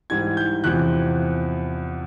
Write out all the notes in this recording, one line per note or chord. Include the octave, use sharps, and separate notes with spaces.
G#2 E3 G3 G#6
G6
E2 C3 F3 F#6